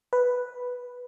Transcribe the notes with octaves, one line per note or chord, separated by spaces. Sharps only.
B4